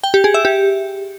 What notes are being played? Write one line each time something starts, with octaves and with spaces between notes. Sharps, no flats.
G5
G4
G#4
E5
G4